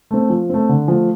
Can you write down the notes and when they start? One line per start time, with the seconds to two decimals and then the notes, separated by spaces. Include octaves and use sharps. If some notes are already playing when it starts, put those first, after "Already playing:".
0.11 A3 C4
0.30 F3
0.50 A3 C4
0.69 D3
0.88 F3 A3